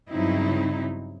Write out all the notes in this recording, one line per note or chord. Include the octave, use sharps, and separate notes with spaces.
G2 C#3 F#3 C4 D#4 E4